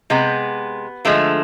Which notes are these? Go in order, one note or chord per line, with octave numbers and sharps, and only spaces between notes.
C3 G#3 B3
D3 F3 G#3 A3